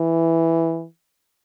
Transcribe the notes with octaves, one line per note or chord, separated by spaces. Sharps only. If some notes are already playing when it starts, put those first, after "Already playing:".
Already playing: E3